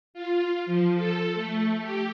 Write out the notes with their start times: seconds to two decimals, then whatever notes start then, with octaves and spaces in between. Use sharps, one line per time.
0.14 F4
0.66 F3
0.95 A4
1.35 A3
1.82 G4